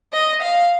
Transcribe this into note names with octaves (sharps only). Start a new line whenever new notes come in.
D#5
F5